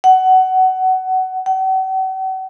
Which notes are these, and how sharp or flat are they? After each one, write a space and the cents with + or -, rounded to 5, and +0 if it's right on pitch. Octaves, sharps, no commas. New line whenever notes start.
F#5 +20
F#5 +45